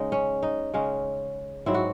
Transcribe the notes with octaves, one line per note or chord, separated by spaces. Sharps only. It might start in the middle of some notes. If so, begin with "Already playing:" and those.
Already playing: C#3 G#3 D#4
C#4
D#4
C#3 G#3 C#4
G#2 F#3 C4 E4
F#4